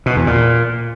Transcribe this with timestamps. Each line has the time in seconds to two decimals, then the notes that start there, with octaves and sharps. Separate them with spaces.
0.06 B2
0.16 E2
0.27 A#2